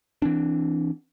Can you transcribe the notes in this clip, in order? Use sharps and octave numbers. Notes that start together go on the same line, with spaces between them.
E3 C4 D4